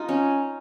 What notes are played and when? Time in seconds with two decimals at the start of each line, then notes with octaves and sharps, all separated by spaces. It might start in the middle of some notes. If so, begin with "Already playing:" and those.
Already playing: D#4 F4
0.09 C#4